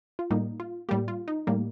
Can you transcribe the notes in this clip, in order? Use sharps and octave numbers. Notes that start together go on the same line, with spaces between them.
F4
A2 G3 A#3 D#4
F4
A2 G3 A#3 G4
F4
D#4
A2 G3 A#3